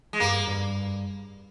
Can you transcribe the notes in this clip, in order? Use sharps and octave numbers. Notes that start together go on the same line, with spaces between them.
G#3
G2 A#3
G2